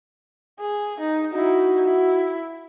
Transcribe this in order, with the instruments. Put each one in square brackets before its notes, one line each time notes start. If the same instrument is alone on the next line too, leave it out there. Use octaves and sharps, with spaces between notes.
[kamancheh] G#4
D#4
[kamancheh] D#4 E4 [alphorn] F#4
[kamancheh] E4